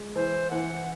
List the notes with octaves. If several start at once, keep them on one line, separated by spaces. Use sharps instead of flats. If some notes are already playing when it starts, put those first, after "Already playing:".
Already playing: G#3
E3 C5
E3 F#5